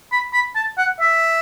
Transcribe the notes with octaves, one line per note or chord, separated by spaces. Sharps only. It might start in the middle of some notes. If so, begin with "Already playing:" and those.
B5
B5
A5
F#5
E5